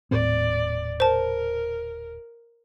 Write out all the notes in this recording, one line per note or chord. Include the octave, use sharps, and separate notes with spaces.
D#1 A2 C4 D5
A#4 C5 A5